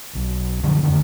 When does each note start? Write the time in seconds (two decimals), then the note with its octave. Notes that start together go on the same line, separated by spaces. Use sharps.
0.15 B1
0.63 F#2 D3 F3 F#3
0.83 E2 D3 D#3